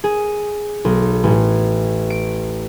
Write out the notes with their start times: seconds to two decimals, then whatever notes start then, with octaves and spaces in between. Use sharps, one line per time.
0.04 G#4
0.85 B1
1.24 A1
2.10 D7